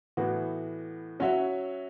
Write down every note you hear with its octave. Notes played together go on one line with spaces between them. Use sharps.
A2 E3 B3 F#4
F#3 C#4 F#4 C#5 E5